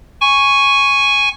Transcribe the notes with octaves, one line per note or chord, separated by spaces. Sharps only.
G#5 C#6